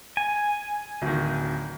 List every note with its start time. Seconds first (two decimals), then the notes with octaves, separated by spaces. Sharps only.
0.17 G#5
1.02 D1 D#3